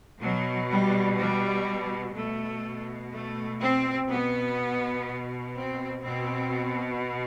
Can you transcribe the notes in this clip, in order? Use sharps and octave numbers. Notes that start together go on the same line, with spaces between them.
B2 F#3
G3
G3
B2 A3
A3
C4
B2 B3
C4
B2 C4